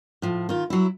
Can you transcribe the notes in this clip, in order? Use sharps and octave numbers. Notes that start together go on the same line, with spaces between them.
A2 F3
D#3 F4
F#3 E4